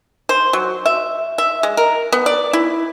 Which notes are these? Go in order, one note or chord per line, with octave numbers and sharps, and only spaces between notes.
C5
F#3
E5
E5
G#3
A#4
B3
D5
E4